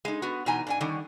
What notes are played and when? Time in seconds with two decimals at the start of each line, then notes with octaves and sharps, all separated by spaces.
0.05 G#3 D#4
0.22 B3 F#4
0.46 B2 E3 D#4 G#5 A#5
0.67 G#2 D4 G#5
0.80 D3 D#3 G3 C#4